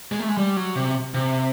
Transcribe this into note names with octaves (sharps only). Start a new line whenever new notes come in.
G#3
A3
G#3
G3
F#3
C3
C3